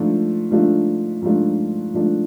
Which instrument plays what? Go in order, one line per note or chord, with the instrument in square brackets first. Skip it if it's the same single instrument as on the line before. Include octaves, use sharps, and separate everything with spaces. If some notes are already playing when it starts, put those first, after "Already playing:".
Already playing: [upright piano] G#2 F3 A3 D4 F4
G#2 F3 A3 D4 F4
G#2 F3 A3 D4 F4
G#2 F3 A3 D4 F4